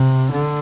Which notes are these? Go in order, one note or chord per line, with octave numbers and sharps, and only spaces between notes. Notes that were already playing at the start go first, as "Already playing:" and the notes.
Already playing: C3
D3